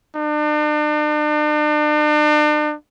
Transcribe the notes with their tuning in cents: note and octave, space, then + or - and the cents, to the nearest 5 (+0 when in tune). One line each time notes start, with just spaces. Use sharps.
D4 +40